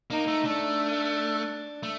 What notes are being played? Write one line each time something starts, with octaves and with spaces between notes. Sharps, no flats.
A#3 D#4
A3
A3 D4
A3